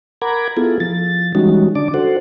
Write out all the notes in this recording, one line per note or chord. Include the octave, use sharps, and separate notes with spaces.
A#4 F#5 A#5 B5 D6 G#6
B3 E4 F4 G#4 A4
F3 A6
E3 G3 G#3 C#4 D#4 F#4
D3 D4 D5 A5 D6
F#4 A4 C5 F#5